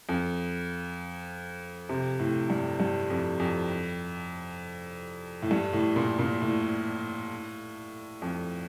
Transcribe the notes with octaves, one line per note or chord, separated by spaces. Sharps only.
F2
C3
A2
G2
G2
F2
F2
A2
G2
A2
A#2
A#2
A2
F2